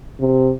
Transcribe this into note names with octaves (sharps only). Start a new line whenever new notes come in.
C3